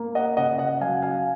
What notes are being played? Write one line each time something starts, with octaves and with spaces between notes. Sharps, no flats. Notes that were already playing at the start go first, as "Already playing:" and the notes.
Already playing: A#3
D#5 F#5
C#3 D#5 F#5
D#5 F#5
F#3 F5 G#5
F5 G#5